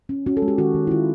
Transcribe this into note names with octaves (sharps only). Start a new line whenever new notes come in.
C#4
C#4 F#4
A4
G#3
G4
D#3 F#4
D#3
E4
D#3 F4